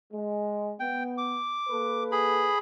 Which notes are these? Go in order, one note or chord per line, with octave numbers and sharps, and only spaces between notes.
G#3
B3 G5
D6
A#3 A4 B4
G#4 B5